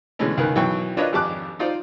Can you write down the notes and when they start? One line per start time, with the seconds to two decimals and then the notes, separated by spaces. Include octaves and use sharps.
0.19 B2 D3 E3 G#3 A3 C#4
0.37 C#2 D#3 A#4 B4 G#5
0.55 B1 E3 F#3 G5 C#6
0.97 D4 F4 A#4 B4 C#5 D#5
1.13 G#1 F2 G4 A5 D6 F#6
1.59 D#4 F4 C5 D5